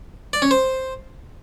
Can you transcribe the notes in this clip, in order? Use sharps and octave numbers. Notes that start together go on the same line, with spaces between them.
D5
C#4
C5